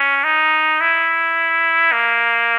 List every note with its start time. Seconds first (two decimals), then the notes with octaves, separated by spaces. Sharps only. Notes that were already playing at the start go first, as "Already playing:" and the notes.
Already playing: C#4
0.24 D#4
0.81 E4
1.92 A#3